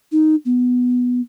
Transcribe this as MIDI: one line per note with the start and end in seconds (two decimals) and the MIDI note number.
0.12 0.36 63
0.45 1.21 59